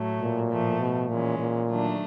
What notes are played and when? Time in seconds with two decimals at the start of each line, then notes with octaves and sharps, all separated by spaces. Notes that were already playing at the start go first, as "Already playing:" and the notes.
Already playing: A2 F#3 A3
0.21 A#2
0.50 A2 F3 A3
0.80 B2
1.09 A#2 E3 G#3 C#4
1.39 A#2
1.68 D#3 F#3 A3 D4